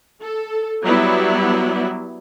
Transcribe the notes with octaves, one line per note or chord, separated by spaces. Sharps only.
A4
F#3 G3 B3 E4